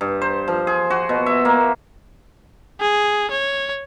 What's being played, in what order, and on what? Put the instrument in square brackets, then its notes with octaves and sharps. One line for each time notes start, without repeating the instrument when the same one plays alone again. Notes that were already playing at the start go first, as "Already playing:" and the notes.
[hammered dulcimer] G2
C5
F3
G#4
F#4
B2
E5
A#3
[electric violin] G#4
C#5